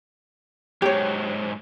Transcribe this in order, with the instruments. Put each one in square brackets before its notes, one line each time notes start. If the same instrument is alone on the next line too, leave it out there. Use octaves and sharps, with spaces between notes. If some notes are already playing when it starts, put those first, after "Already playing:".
[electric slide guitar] G#2 F#3 [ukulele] G4 C#5